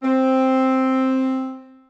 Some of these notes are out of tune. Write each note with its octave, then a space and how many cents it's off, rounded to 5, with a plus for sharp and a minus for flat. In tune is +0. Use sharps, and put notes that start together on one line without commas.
C4 +5